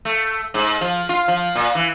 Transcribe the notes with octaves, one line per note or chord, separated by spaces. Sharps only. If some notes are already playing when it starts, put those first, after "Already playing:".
A3
G#2
F3
F4
F3
A#2
E3